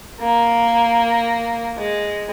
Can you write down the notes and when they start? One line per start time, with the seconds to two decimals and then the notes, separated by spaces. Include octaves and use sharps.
0.20 A#3
1.77 G#3